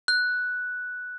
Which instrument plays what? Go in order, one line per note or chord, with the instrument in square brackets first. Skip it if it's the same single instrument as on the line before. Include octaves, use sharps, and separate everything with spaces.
[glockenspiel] F#6